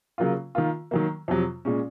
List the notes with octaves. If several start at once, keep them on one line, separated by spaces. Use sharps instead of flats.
C#3 F#3 A#3 F4
D#3 A#3 F4
D#3 F#3 A#3
F2 C3 F#3
A#2 G#3 C#4